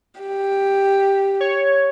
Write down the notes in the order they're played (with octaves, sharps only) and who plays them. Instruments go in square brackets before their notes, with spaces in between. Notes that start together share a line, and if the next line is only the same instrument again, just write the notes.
[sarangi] G4
[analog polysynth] C#5